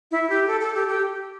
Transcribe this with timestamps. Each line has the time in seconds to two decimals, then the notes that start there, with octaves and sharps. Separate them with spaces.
0.11 E4
0.30 G4
0.48 A4
0.61 A4
0.75 G4
0.88 G4